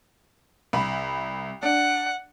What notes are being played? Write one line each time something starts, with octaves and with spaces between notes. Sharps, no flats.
C2 B5
D4 F#5